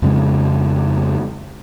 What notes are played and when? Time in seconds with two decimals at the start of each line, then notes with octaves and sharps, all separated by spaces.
0.02 F2 C#3 G#3